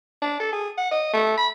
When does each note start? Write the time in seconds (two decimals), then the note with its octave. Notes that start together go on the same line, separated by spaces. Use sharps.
0.22 D4
0.40 A4
0.53 G#4
0.77 F#5
0.91 D#5
1.13 A3
1.37 B5